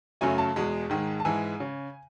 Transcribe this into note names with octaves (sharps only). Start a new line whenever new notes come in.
F#2 C#3 F#3 A3 G#5
A5
E2 B2 G#3
G#2 D#3 G#3
A5
G#2 E3 G#3 G#5
C#3